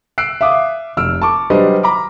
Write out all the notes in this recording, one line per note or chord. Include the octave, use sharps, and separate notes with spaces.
E6 F#6 C7 D7
E5 F5 D6 D#6
F1 E6 F6 D7
A5 C#6 D6
F#3 G3 D4 B4 C5 D#5
A#5 B5 D6